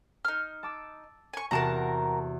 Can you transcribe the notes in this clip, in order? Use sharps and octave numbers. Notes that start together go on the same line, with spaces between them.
D#4 F6
A5 D6 E6
G#5 C#6
E2 C3 F#4 A#4 A5 A#5